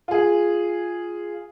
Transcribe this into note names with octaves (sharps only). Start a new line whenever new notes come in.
F4 G#4